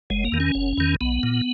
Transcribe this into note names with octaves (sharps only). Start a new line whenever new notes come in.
F#1 G#3
A#3
E2 D#3
C#4
F#1
E2 D#3
B1 B3
A#2